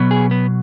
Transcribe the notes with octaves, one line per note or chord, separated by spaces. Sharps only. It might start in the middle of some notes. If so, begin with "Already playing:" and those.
Already playing: B2 F#3 B3
G#4
B3